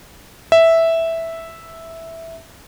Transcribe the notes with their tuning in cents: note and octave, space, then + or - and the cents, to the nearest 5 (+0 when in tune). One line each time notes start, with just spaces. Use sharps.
E5 -5